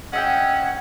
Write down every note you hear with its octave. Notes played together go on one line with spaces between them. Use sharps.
C#4 D#5 E5 F#5 G5